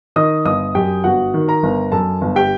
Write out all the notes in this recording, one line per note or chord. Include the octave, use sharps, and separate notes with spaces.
D#3 D#5 D#6
G1 D#5 D#6
F#2 G4 G5
G1 F#4 F#5
D#3
A#4 A#5
G1
F#2 A4 A5
G1
G4 G5